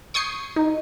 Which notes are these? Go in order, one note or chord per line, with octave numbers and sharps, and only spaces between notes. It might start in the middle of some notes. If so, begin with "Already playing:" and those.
C#6 D#6 G6 G#6 C7 C#7
D#4